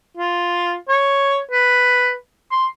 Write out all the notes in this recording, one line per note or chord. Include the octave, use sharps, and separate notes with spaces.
F4
C#5
B4
C6